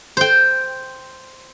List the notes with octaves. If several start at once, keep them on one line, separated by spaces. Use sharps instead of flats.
C5 G5